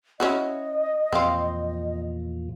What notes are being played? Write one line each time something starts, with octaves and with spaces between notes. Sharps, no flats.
C#4 E4 F#4 D#5
E2 A#2 F3 C4 F5